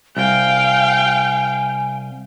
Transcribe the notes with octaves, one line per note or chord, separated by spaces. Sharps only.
C2 F5 G5 G#5